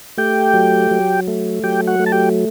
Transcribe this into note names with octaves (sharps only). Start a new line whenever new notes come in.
A3 G4 G5
F#3
F#3
A3
F#3 G4 G5
F#4 F#5
A3
A5
G4 G5